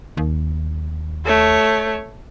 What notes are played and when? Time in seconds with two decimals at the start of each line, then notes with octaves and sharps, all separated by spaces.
0.17 D#2
1.26 A3 C#5